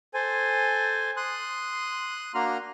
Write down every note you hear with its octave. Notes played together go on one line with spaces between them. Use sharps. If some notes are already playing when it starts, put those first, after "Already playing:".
A4 C5 G#5
C6 D#6 F#6
A#3 D4 F#4 A#5 C6 F6